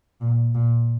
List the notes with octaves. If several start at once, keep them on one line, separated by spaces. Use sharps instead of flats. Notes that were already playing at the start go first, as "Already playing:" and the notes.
A#2
A#2